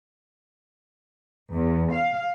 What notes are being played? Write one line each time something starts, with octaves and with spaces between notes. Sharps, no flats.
E2
F5